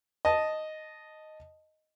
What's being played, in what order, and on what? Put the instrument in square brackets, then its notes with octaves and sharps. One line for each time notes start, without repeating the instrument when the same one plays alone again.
[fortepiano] D#5 A5